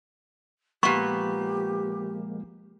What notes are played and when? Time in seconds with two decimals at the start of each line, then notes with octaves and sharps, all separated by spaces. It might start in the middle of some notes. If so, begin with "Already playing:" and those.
0.83 A#2 F3 G#3 A#3 B3 G4 C#6